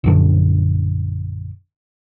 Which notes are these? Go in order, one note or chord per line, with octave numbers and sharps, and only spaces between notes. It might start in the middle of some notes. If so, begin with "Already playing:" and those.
A#1 F#2 D3